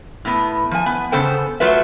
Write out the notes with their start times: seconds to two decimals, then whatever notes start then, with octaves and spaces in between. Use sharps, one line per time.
0.25 A2 B3
0.71 F3 G#5
0.86 B3
1.12 C#3 B3 A4 C5 G5
1.60 F#3 A3 F4 A4 B4 E5